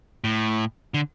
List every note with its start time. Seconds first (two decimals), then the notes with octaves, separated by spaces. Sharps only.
0.24 A2
0.94 D3